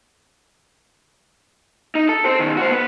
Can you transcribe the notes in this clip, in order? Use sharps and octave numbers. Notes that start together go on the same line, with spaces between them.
D#4
A4
C4 C5
B2 D#3
F#4 C5
B3 B4